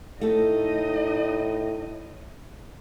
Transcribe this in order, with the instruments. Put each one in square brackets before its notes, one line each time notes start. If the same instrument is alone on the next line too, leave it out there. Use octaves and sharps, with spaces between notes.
[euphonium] A2 [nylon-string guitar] A3 A4 [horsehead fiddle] D#4 D#5